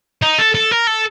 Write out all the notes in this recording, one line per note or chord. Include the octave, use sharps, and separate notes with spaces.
D#4
A4
A4
A#4
A4